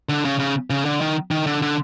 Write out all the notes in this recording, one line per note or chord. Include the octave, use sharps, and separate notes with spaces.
D3
C#3
C#3
C#3
D3
D#3
D#3
D3
D3